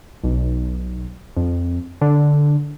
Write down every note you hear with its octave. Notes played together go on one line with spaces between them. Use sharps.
B1
F2
D3